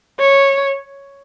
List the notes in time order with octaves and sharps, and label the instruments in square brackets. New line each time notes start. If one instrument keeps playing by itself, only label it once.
[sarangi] C#5